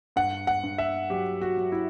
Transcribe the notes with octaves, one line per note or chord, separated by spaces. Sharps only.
G2 F#5
F#5
G2
E5
F#3 G4
F#4
F#3
E4